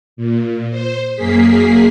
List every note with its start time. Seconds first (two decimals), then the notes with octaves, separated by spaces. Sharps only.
0.17 A#2
0.70 C5
1.14 F#2 A#3 G#4 B6 C7